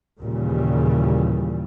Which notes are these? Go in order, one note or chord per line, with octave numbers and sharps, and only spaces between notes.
D#2 A#2 C#3 E3 G3